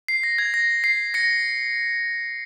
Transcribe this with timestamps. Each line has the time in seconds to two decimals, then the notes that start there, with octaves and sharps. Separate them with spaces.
0.08 C7
0.23 A#6
0.38 G#6
0.54 A#6
0.84 C7
1.14 A#6 C#7